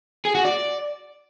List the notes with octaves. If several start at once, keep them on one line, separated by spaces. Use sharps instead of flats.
G#4
F#4
D5